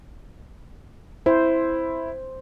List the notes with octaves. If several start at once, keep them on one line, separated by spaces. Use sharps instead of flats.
E4 C5